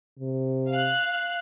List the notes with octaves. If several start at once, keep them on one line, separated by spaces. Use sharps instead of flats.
C3
F5 F#6